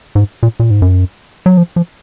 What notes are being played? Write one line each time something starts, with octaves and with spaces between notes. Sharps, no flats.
G#2
A#2
A#2
G#2
F#2
F#3
F3
F3